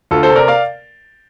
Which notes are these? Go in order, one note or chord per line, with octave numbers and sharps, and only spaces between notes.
D2 F4 A4
A4 C5
C3
A#4 D5
D5 F5